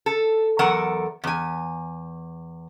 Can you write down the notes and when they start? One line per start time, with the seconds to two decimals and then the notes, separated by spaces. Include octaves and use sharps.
0.06 A4
0.59 E2 F#3 A4 A#4 F#5
1.24 E2 G#5